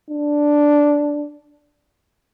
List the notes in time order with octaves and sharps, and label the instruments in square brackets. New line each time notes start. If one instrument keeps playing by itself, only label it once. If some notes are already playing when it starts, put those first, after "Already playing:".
[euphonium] D4